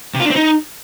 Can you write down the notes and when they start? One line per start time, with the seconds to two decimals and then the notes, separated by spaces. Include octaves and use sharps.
0.14 C3
0.20 F4
0.25 D4
0.30 C4
0.36 D#4